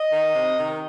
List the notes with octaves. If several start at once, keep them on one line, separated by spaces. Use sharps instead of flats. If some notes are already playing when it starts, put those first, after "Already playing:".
Already playing: D#5
D#3
C3
D#3